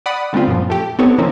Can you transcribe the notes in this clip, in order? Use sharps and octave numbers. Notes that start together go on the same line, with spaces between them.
D5 F#5 B5 D#6
D3 G3 G#3 C4 F4
F#2 A#2 F3
A3 G4
B3 C4 D#4 G4 A4 C#5
D#3 F3 A#3 C4 C#4